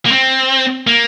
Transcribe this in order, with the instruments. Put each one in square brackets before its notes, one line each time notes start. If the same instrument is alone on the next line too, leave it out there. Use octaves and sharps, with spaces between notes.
[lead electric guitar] A#3
C4
A#3